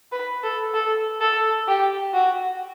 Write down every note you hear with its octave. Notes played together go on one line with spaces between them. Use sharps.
B4
A4
A4
A4
G4
F#4